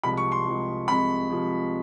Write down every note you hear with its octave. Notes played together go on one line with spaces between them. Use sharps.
C2 C3 F3 G#3 B5
C#6
C6
C2 C3 F3 G#3
C2 C3 F3 G#3 B5
C2 C3 F3 G#3